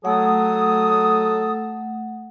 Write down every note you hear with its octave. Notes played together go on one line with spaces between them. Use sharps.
F#3 A3 A4 F#5 D#6